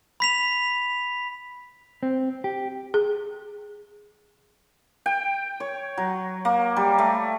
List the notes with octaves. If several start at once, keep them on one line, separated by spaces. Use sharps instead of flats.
B5 B6 F7
C4
G4
G#4
G5
C#5
F#3
A#3
G3
A3